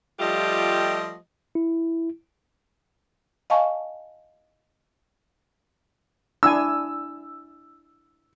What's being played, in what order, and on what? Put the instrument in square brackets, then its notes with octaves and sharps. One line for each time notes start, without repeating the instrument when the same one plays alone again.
[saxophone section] F3 G3 A3 F4 G4 D#5
[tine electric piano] E4
[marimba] D#5 F5 G#5 A5 C#6
[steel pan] D4 E4 G#5 [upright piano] E6